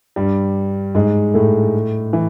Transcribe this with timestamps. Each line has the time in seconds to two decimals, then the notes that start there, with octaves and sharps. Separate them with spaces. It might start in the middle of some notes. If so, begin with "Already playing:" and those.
0.16 G2 G3
0.95 G#2 G#3
1.34 A2 A3
2.13 E3